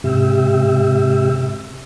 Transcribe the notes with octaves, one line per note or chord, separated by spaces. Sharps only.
G#2 C3 G4 E5